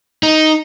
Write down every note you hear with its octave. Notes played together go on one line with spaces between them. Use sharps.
D#4